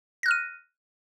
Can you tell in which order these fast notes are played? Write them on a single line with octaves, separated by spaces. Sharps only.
A#6 F#6 F6 D#7